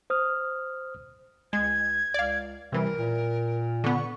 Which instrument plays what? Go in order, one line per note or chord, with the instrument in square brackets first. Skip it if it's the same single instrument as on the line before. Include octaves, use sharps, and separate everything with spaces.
[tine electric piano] C5 D#6 F6
[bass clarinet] C#2 [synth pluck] G#3 [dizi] G#6
[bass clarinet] C#2 [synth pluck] D5 F5
[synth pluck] C3 E3 [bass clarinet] G3 [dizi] A#4
[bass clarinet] A#2
[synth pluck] D3 B3 [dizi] C#6